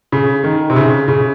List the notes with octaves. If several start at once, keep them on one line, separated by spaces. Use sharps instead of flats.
C#3
D#3
C3
C#3
C#3